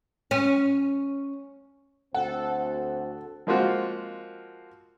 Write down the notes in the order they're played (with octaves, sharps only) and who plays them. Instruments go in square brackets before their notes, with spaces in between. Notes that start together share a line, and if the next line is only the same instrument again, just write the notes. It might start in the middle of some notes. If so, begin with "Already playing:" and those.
[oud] C#4
[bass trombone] D2 [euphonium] C4 [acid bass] A4 [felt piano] F#5
[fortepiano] F3 G#3 A#3 C4 F4 F#4